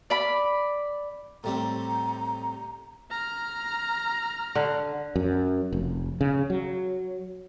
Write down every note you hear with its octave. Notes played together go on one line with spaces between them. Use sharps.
D5 B5
A2 G3 C4 A#5
A#5 F6
D3
F#2
F1
C#3
F#3